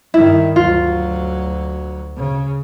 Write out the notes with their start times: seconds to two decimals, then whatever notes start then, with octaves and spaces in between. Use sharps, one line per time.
0.14 G2 D#3 E4
0.56 D2 F#3 F4
2.17 C#3